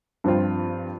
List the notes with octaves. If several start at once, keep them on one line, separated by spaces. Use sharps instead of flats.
G2 F3 C4 F4